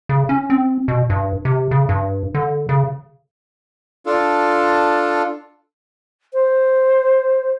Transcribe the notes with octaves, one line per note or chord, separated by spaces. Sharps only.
C#3
C#4
C4
B2
G2
C3
C#3
G2
D3
C#3
D4 F4 A4
C5